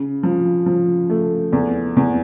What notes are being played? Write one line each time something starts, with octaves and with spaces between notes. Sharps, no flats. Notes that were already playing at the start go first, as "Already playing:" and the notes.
Already playing: C#3
F3
F3
A3
E2
E2